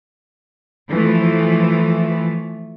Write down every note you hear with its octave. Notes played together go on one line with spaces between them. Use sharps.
E3 F3 A3